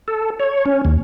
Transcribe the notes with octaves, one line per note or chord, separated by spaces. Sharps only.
A4
C#5
C#4
D#2